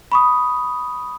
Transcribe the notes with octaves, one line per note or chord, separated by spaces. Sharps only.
B5 C#6 D#6